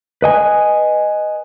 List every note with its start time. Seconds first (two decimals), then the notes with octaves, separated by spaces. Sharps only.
0.22 B4 D#5 G#5